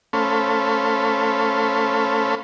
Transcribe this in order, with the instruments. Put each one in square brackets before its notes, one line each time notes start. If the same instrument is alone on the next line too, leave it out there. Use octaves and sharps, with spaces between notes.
[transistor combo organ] A3 C#4 A4 C5 F5 B5